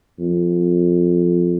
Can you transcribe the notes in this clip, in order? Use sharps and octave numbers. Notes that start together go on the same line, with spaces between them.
F2